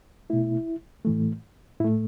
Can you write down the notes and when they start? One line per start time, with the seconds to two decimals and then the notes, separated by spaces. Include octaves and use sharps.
0.30 B2 A3 E4
1.05 A2 E3 A3
1.80 A2 E4
1.84 A3